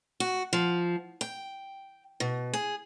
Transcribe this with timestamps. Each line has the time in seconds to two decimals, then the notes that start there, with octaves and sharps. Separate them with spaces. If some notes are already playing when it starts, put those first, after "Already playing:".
0.20 F#4
0.53 F3
1.21 G5
2.20 B2
2.53 G#4